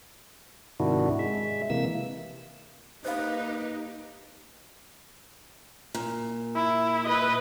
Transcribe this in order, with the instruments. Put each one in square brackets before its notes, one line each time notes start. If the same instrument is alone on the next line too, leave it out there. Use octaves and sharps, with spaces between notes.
[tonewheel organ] G#2 C3 D#3 D4 E4 F#4
G#3 E5
C3 E3 A#3 E6
[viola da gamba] A#3 G4 [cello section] D#4 [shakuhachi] B4 [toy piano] C5 F5
[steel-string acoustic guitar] A#2
[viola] E4
B4 D#5